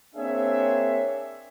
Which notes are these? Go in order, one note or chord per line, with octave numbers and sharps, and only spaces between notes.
A#3 C4 D4 G#4 C#5 E5